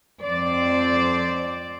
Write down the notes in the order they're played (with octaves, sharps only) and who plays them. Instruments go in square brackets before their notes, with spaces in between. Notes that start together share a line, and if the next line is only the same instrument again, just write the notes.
[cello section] F2 C4 C5 D5